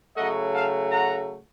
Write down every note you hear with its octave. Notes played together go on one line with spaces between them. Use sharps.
C#3 F#3 A3 D#5 F#5
F5 A5
F#5 A#5